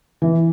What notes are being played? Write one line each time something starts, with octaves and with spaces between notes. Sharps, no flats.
E3